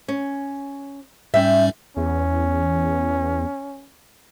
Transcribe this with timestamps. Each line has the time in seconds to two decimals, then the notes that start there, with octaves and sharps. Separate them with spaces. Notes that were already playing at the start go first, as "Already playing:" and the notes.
0.08 C#4
1.34 G#2 G3 C#4 E5 G5
1.97 E2 C#4